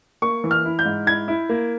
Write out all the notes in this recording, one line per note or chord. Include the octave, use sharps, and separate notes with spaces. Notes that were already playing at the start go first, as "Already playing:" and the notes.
A#3 C#6
E3
F6
E4
G6
G#2
E4 G#6
E4
A#3